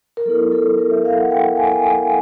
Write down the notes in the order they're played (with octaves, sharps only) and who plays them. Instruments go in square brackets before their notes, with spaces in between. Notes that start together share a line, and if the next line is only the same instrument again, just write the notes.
[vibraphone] A#4
F#3 B3 E4 A4
A4
A#4
E5
F5
F#5
G5
G#5
G5
G#5